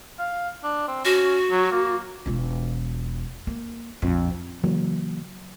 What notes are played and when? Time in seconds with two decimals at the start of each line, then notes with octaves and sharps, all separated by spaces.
0.19 F5
0.64 D4
0.88 C4
1.05 C#4 F#4
1.51 F#3
1.72 A#3
2.26 E1 F4
3.47 A#3
4.02 A#1 F2
4.63 C#3 E3 F#3 A#3